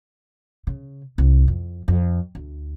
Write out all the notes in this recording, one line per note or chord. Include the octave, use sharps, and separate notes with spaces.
C#3
C2
F2
F2
D2